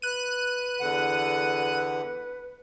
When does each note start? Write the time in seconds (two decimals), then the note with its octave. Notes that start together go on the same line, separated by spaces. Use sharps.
0.02 B4 F#6 D#7
0.80 E2 D3 F#5